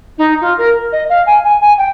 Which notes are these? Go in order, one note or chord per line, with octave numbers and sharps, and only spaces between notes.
D#4
F4
A#4
D#5
F5
G#5
G#5
G#5
G5